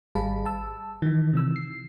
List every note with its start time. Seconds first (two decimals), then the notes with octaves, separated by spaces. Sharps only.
0.15 G#1 G3 G#4 F5 A5 B5
0.45 A5 E6
1.02 D#3 E3
1.33 C3 E3 E6
1.56 C7